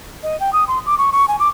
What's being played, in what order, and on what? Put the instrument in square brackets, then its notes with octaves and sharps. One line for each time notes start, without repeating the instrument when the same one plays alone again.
[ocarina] D#5
G5
D#6
C6
D6
C#6
C#6
G#5
D6